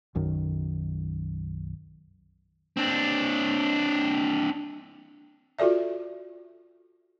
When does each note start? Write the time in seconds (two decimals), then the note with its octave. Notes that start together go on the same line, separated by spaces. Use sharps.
0.15 B1 F#2 D#3
2.77 C4 D4
5.58 F4 F#4 A4 D5 E5